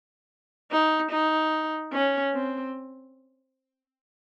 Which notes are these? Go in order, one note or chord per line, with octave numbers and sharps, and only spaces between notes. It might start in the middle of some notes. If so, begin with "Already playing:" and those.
D#4
D#4
C#4
C4